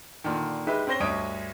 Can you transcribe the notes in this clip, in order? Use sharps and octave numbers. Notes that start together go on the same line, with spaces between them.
A#2 D3 D#3
G#3 D#4 G4 B4 E5
C4 C#4 C5 A#6 G7
D2 G2 C#5 D#5 D#6 D7